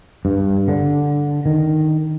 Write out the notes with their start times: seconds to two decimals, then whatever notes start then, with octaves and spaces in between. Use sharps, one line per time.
0.25 G2
0.68 D3
1.46 D#3